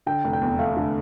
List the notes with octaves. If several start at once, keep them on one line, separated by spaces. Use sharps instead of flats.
D3 G5
F1
G5
E2
A3 F5
D3